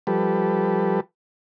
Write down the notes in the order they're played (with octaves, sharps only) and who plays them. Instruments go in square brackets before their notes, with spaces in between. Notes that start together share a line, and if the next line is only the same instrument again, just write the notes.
[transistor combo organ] F3 G3 G4 A4 B4